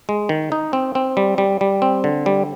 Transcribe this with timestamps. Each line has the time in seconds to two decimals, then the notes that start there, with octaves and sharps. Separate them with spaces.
0.09 G#3
0.29 D#3
0.52 D#4
0.73 C4
0.95 C4
1.17 G3
1.38 G3
1.61 G3
1.82 C4
2.04 D3
2.26 G3